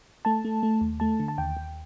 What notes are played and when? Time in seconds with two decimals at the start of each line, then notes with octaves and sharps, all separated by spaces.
0.25 A3 A5
0.45 A3
0.63 A3
0.81 D#2
1.00 A3 A5
1.20 D3
1.28 A5
1.38 D#2 G5
1.57 D#2